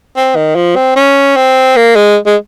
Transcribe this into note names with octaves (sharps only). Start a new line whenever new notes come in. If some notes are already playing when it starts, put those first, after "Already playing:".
C4
D#3
F3
C4
C#4
C4
A#3
G#3
G#3